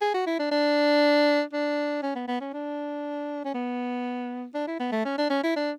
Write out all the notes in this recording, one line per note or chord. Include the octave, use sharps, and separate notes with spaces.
G#4
F#4
E4
D4
D4
D4
C#4
B3
B3
C#4
D4
C#4
B3
D4
E4
B3
A3
C#4
D4
C#4
E4
D4